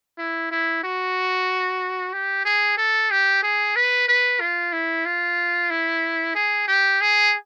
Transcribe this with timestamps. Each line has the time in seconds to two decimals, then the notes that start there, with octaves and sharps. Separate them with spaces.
0.18 E4
0.51 E4
0.84 F#4
2.13 G4
2.45 G#4
2.78 A4
3.11 G4
3.43 G#4
3.76 B4
4.08 B4
4.41 F4
4.73 E4
5.06 F4
5.70 E4
6.35 G#4
6.68 G4
7.01 G#4